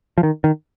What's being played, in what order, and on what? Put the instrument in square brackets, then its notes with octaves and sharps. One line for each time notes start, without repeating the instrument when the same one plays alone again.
[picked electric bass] F3
D#3
D#3